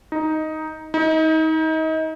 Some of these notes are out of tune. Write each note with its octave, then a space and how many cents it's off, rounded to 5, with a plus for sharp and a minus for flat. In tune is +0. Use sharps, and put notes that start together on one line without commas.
D#4 +5
D#4 +30